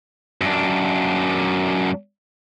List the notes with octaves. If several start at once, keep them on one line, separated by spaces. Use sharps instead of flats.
F#2 D4